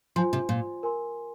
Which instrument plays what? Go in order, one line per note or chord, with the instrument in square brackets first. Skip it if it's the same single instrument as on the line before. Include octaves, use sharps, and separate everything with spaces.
[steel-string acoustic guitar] F3 [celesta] F4 C5 G#5 C6
[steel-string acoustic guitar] C3
A#2
[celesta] A#4 G#5 C6